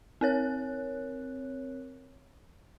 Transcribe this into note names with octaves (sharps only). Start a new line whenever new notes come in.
C4 A#4 C#5 F#6